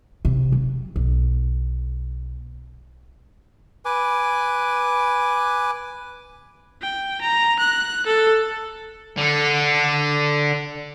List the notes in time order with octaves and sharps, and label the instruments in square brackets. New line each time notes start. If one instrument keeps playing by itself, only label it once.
[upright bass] C3
F#3
B1
[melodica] B4 G#5 D6
[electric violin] G5
A#5
F#6
A4
[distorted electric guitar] D3 A4